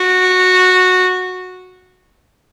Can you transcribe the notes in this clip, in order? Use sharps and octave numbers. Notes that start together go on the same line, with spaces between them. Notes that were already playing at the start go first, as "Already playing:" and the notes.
Already playing: F#4